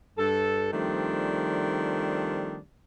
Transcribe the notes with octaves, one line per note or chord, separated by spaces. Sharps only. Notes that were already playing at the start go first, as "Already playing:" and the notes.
G2 A4
D#3 F3 G3 A3 C4 D4